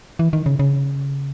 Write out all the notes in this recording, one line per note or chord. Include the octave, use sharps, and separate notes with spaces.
E3
D#3
C#3
C#3